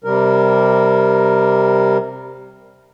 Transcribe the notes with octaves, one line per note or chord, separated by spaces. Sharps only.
C3 G3 A#4